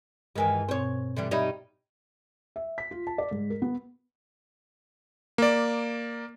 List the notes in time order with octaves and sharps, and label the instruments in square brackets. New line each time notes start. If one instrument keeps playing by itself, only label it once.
[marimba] G2 A#4 G#5 [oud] D#3 E3 G#3
[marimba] B2 C4 [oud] C5 C#5
[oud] D3 E3 G3
[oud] G3 D#4 C#5 [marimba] D#5 E5 B5
[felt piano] E5
B6
F4
A5
D5
G#2
A#4
B3
[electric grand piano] A#3 D5